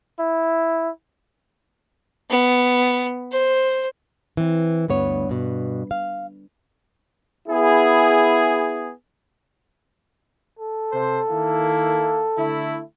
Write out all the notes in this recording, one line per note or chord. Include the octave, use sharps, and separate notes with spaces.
E4
B3
C5
E3 C4
D2 G2 B3 C#5
G2 B2
F5
B3 E4 G#4
A4
C3 C5
D#3 A#3 E4
D3 A3 E4